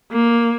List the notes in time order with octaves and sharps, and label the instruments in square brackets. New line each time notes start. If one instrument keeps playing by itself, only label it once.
[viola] A#3